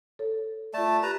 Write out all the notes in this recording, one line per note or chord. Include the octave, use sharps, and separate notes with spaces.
A4 C#5
A3 F4 D5 A5
G4 B4 A#5